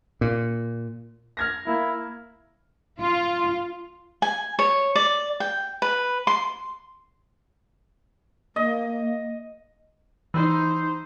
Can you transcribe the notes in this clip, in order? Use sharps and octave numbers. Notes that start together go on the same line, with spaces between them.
A#2
F6 G#6 A#6
A#3 E4
F4
G#5
C#5
D5
G5
B4
C6
A#3 D#5
E3 D#4 C5